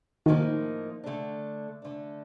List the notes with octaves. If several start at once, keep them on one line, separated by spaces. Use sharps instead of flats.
A2 D#3 F3 A#3 D#4
D3 A3 D4
D3 A3 D4